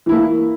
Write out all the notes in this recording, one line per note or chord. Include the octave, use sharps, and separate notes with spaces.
E3 A#3 E4